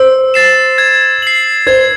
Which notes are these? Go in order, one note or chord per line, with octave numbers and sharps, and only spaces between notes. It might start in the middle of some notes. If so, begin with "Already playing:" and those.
Already playing: C5 E6
A6 C7 E7
G#6
C7 F#7
C5 G#6